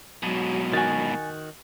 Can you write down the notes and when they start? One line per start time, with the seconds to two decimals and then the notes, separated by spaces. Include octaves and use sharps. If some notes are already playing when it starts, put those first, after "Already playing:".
0.23 G#2 B2 F#3
0.73 D#3 F#4 G#5 A6